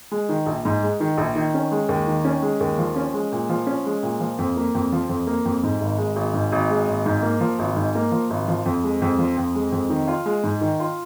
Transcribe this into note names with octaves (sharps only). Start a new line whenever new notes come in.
G#3
D#3
A#1
G#2
G#3
D#3
A#1
D#3
C#4
G#3
D#2
D#3
C#4
G#3
D#2
F3
C#4
G#3
A#2
F3
C#4
G#3
A#2
F3
F2
A#3
F2
F3
F2
A#3
F2
G#2
G#1
G#3
G#1
G#2
G#1
G#3
G#1
G#2
A#3
F3
G#1
G#2
A#3
F3
G#1
F3
F2
G#3
F2
F3
F2
G#3
F2
D#3
F4
G#3
G#2
D#3
F4